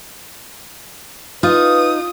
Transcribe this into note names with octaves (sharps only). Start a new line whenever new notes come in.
D#4 F4 B4 D#6